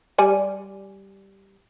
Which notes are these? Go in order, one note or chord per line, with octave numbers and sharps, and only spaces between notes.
G3 D5 G#5